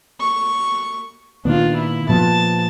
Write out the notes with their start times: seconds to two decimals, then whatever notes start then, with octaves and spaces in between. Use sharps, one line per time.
0.20 C#6
1.45 A#2 D#3 B3 D4 F4
1.76 E4
2.09 A#2 F3 B3 A5